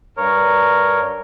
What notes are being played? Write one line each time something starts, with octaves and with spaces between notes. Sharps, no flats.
G2 A#4 C#5